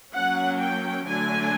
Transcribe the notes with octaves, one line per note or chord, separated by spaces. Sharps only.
F#3 A#3 C#4 F#5
G5
D3 F#3 A3 D4 G#5